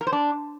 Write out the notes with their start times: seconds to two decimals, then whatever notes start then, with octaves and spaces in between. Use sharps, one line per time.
0.01 A#4
0.07 C5
0.13 D4